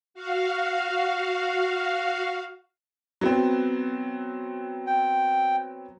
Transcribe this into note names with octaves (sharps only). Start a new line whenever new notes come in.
F#4 F5
F#3 B3 C4
G5